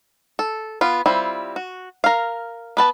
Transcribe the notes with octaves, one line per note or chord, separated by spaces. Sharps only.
A4
B3 F4
G3 C4 E4 F4
F#4
A#4 F5
B3 B4 A5